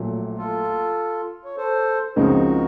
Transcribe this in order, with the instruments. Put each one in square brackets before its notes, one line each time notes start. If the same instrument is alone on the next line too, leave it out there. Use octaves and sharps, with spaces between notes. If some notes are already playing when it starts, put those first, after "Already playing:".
Already playing: [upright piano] A#1 A#2 F#3 A3
[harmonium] F4 A4
C#5
A4 C5
[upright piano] C#2 C#3 F3 C4 D#4 [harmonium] F#4 A#4